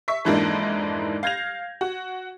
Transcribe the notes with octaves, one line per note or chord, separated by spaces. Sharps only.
E5 C#6 B6
F2 G#2 E3 A#3 D4 D#4
F5 G6 G#6 A#6 F7
F#4